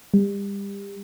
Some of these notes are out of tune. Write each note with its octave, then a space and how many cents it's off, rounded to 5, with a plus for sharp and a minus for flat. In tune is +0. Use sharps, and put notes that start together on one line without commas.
G3 +30